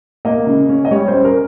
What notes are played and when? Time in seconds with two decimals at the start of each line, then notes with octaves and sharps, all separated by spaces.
0.25 A#3 D#5
0.47 C#3
0.69 C#4
0.85 D#5
0.91 G3 C#5
1.08 C5
1.13 C#4
1.24 A#4